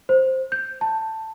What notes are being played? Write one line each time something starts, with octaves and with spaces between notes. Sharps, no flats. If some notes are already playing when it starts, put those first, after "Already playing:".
C5
G6
A5